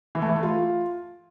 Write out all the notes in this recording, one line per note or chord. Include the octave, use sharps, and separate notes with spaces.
E3
A3
E3
A3
F4